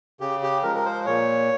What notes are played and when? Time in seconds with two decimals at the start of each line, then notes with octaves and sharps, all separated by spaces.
0.20 C#3 G4
0.43 G4
0.63 F3 G#3 A#4
0.75 A#4
0.85 C5
1.06 A#2 C#5